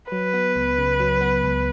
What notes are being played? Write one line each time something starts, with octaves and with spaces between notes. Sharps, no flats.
F#3 B4
B3
C#2
C#3
F#3
B3
C#2